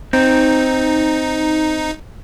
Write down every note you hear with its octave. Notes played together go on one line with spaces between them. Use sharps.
C4 D#4